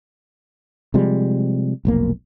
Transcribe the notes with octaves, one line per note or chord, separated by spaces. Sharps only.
C3 F3 G3 G#3
F1 B1 A#3